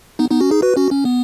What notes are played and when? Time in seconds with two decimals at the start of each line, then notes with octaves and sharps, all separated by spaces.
0.19 B3 D#4
0.30 B3 D#4
0.40 C#4 F#4
0.51 D#4 G#4
0.62 F#4 B4
0.77 C#4 F#4
0.91 C#4
1.05 B3